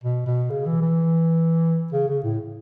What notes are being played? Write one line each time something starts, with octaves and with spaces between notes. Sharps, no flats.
B2
B2
C#3
E3
E3
C#3
C#3
A2